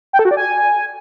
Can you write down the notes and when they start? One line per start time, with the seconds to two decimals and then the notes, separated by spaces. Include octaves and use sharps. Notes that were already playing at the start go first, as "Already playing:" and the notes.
0.13 G5
0.19 A4
0.25 F#4
0.31 D5
0.37 G#5